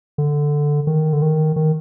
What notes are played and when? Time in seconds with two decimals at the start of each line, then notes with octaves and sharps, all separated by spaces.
0.18 D3
0.87 D#3
1.13 D3
1.22 D#3
1.56 D#3